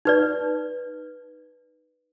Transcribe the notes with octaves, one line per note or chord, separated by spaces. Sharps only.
D#4 B4 D5